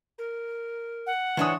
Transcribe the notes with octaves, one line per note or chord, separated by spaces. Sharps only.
A#4
F#5
G#2 E3 D4 C#5 G#5 D#6